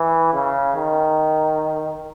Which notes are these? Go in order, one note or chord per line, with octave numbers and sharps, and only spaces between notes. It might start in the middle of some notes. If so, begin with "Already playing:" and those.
Already playing: E3
C#3
D#3